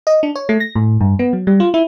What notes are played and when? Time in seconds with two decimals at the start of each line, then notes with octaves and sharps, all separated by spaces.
0.07 D#5
0.23 D4
0.36 C#5
0.49 A3
0.60 A#6
0.75 A2
1.01 G2
1.19 B3
1.33 F#3
1.47 G3
1.60 F4
1.74 E4